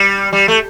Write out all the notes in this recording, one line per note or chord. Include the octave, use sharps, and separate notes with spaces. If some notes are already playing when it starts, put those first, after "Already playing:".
Already playing: G3
G3
A3